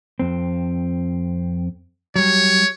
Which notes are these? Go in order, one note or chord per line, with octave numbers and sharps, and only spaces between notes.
F2 C4
F#3 G3 C#5